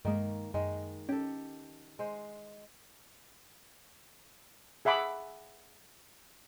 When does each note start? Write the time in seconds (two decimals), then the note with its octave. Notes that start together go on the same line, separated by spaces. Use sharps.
0.05 G2 D#3 G#3 A#3
0.54 F#2 D#3 G#3
1.09 C#4 G4 A4
1.99 G#3 C5
4.85 G#4 E5 F#5 B5 D6